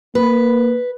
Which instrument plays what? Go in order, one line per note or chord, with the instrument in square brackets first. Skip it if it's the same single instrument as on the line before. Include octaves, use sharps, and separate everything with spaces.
[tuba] A#3 [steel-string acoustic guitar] B4